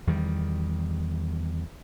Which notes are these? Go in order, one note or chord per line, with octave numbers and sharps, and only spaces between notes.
E2 D#3 G3